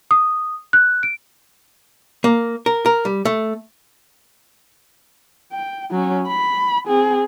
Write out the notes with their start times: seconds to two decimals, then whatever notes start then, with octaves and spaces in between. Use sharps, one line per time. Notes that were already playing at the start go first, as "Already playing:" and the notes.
0.11 D#6
0.73 F#6
1.03 D7
2.24 A#3
2.66 A#4
2.86 A#4
3.05 G3
3.25 A3
5.53 G5
5.91 F#3 C#4
6.27 B5
6.86 C4 G#4